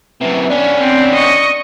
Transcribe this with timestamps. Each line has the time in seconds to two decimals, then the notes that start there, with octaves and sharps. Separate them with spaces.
0.21 F#2 C3 E3
0.50 B3 C#4 D4
0.81 C4
1.15 D#5 C#6